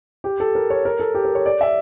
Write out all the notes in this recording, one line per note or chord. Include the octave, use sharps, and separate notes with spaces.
G4
A4
A#4
C#5
A#4
A4
G4
A#4
C#5
D5
E5